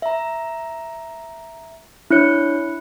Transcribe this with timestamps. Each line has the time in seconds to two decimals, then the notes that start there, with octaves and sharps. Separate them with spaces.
0.02 E5 A#5
2.11 D4 E4 C#5 F#6 C#7